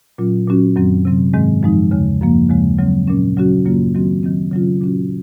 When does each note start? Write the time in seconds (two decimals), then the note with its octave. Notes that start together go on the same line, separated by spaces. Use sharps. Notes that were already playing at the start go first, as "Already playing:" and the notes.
0.18 A#2 F#3 C#4 F4
0.47 A#2 F#3 C#4 F#4
0.76 F#2 D#3 F#3 C4
1.05 C3 F#3 C4
1.34 G#2 D#3 G#3 C4
1.63 F#2 F3 G#3 D#4
1.91 D#2 C#3 G#3
2.21 F#2 F3 A#3
2.49 D#2 C#3 F3 G#3
2.79 C#3 F#3 C4
3.08 A#2 F#3 C#4
3.37 C#3 F#3 C#4 F#4
3.65 F#2 C#3 F#3 A#3 F4
3.94 D#3 F#3 C4 F#4
4.23 D#3 F#3 C4
4.52 C#3 F#3 C#4 F4
4.81 A#2 F#3 C#4 F#4